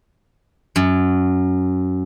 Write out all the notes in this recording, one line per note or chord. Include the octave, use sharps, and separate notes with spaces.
F#2